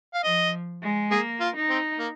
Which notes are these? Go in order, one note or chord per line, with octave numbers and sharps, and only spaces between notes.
F5
F3 D#5
G#3
A#3 G#4
F4
D#4
C4
A#3